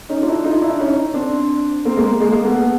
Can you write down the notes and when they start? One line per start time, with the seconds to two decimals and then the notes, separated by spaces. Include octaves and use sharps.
0.09 C#4 D#4
0.22 F4
0.27 D4 E4
0.44 D#4 F4
0.62 D4 E4
0.79 C#4 D#4
1.14 C4 D4
1.85 A#3 C4
1.96 G#3 A#3
2.20 G#3 A#3
2.32 G#3 A#3
2.44 A3 B3